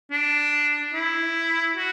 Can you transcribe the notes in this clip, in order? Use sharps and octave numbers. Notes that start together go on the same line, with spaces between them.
D4
E4
F#4